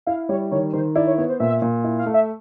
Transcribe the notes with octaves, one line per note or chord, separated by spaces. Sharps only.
E4 F5
G3 C#5
D#3 C#5
D#3 C5
E4 D5
C#5
B3 C#5
C5
A#2 E5
A#2
E4
F5
A3
E5